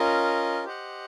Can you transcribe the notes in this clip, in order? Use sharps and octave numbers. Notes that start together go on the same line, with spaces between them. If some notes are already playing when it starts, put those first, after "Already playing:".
Already playing: C#4 F4 A#4 D#5
G4 C5 D#5 F#5